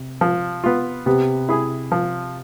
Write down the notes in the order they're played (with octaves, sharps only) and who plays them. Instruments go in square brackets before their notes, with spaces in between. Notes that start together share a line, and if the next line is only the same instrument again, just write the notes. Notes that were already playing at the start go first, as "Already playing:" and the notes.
Already playing: [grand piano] C3
[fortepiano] F3
B3 F4
[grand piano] C3 [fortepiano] B3
[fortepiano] E4 G#4
F3